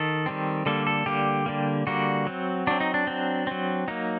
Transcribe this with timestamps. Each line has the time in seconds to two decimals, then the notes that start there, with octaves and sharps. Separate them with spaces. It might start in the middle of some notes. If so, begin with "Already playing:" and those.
Already playing: D#3 A4
0.26 D#3 G3 C4
0.66 D3 G3 A#3 A4
0.87 A4
1.06 D3 G3 A#3 G4
1.46 D3 G3 A#3
1.87 D3 G3 A#3 F#4
2.27 F#3 C4
2.67 F#3 C4 D4
2.80 D#4
2.94 D4
3.07 F#3 C4
3.47 F#3 C4
3.88 F#3 A#3 D#4